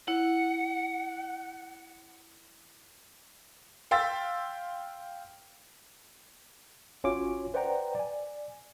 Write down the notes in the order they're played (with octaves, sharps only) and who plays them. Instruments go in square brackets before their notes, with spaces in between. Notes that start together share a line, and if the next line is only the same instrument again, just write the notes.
[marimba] E4 [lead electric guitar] F#5
[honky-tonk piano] F5 G5 C6 E6 A6 B6
[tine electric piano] G#1 C#4 F4 F#4 C#5 D6
B4 C5 D5 F#5 G5 A#5
D5 G#5